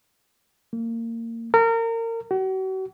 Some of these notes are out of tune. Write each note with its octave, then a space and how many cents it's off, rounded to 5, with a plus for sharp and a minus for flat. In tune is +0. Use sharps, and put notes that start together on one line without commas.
A#3 -25
A#4 -30
F#4 +40